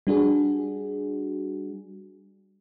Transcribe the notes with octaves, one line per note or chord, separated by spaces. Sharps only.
G3 D4 F#4 G#4